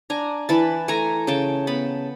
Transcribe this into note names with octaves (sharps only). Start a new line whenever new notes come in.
D4 G#5 A#5
E3 A5 B5
A3 G#5 A#5
C#3 G5 A5
B3 A5 B5